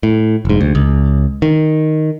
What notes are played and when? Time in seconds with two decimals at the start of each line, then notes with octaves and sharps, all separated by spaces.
0.03 A2
0.45 F1 G#2
0.61 D2
0.75 C#2
1.42 D#3